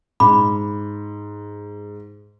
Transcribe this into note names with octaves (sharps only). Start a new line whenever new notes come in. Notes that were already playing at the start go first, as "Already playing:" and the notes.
G#2 B5 D6